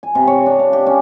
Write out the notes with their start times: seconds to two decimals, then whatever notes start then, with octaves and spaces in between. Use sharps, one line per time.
0.03 G#5
0.15 C3
0.27 C#5
0.46 D4
0.59 F5
0.73 G4
0.86 C#4